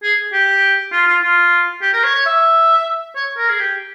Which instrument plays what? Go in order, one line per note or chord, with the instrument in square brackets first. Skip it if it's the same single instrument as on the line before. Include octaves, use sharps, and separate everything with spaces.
[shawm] G#4
G4
F4
F4
F4
G4
A#4
C#5
C#5
E5
C#5
A#4
G#4
G4